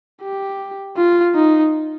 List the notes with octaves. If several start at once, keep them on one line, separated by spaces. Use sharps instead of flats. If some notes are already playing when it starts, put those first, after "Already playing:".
G4
F4
D#4